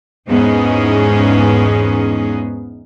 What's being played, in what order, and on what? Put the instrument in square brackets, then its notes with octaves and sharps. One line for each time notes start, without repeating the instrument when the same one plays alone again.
[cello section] E2 G#2 B3 C#4 D#4 G#4